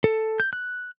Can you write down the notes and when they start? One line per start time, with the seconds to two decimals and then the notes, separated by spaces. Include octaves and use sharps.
0.04 A4
0.40 G6
0.53 F#6